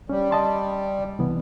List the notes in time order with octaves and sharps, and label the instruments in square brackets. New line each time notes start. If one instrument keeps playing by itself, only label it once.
[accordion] G3 [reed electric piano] C#4
[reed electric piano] D#5 A5 C6
C2 E3 B3